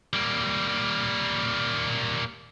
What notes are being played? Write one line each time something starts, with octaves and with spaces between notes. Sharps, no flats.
G3 A#3